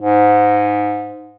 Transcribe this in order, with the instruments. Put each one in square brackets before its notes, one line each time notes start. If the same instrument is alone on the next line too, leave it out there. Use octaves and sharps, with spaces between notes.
[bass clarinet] G#2